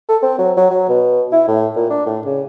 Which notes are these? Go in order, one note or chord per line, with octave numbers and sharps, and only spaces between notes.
A4
C4
F#3
F#3
F#3
B2
E4
A2
A#2
D4
A2
C#3